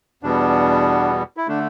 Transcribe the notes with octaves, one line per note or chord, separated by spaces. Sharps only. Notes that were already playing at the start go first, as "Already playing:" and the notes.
E2 B2 G3 B3 D4
E4
D3 A3 D4